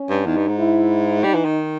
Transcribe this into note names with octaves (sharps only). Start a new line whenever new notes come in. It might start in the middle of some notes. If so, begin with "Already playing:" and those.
Already playing: C#4
G2
E2 D#4
G2
G#2
E4
G3 D#4
E3
D#3